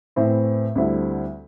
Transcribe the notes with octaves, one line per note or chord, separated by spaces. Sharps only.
A2 E3 C4 E4
D2 D3 G3 C4 E4